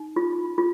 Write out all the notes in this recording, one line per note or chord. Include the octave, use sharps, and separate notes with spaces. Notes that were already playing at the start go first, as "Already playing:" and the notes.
Already playing: D#4
F4
F4